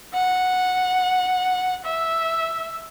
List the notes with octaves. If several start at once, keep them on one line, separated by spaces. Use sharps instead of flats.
F#5
E5